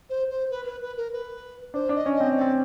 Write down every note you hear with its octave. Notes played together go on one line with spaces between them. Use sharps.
C5
C5
B4
B4
B4
A#4
B4
D4 C5
D4
D#5
C#4
C4 D#5
C4 D5